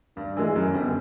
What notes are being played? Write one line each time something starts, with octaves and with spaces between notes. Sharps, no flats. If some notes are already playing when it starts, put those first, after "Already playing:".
G2 D4
E3 G#3
F#2 C#4
D3 G3 B3